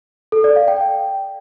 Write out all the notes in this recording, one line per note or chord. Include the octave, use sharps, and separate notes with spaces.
A4
D5
F5
G5